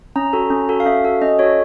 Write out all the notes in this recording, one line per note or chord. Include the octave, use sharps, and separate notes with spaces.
C#4 A#5
F#4 A4
C#4
F#4 A4
F5
C#4 E5
F#4 A4
C#4 D#5
F#4 A4 C#5